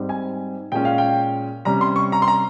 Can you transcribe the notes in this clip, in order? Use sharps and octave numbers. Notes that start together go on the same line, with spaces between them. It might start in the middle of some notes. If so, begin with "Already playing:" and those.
Already playing: G#2 G3 C4 D#4
G#5
A#2 G#3 C#4 G5
F5
G5
C3 G3 C#4 A#5
C6
C#6
A#5
C6
A#5